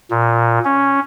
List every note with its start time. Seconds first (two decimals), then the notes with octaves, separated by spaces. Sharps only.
0.11 A#2
0.65 C#4